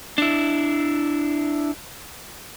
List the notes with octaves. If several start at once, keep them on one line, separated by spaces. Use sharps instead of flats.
D4 E4